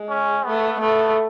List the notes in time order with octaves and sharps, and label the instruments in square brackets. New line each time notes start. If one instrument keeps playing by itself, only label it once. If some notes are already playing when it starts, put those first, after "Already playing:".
Already playing: [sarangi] G#3
[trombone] C#4
[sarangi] A3 [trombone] B3
[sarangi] A3 [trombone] B3